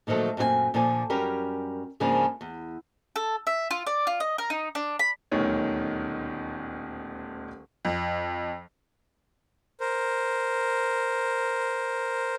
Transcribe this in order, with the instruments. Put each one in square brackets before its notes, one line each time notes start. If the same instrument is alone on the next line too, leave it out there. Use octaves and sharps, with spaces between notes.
[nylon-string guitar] A#2 D#3 F3 F#3 A3
F#2 A#2 C4 G4 G#5
A#2 D3 F3 D5 G#5
F#2 G3 C#4 G4 A#4
G#2 C#3 F3 A#3 D4 G#5
E2
[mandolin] A4
E5
F4
D5
F4
D#5
A#4
D#4
D4
B5
[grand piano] D#1 D2 B2 D#3 C#4 C#5
[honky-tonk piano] F2
[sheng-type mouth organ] A#4 C5